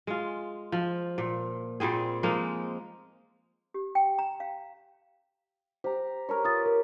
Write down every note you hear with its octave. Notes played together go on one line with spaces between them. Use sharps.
G#3 F4
F3
A#2
A#2 G3 C4 G#4
F3 G#3 A#3 D#4
G4
G5
A#5
F5
G4 C5 A#5
A#4 B4 C#5
F4 D#6 A6
A#4